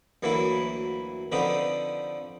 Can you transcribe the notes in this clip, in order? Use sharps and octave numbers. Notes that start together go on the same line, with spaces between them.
D2 E3 F#3 A#3 E4 B4
D3 F3 C4 D4 D#4 B4